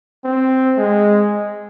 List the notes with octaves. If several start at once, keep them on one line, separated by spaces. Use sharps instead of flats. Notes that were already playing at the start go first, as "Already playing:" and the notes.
C4
G#3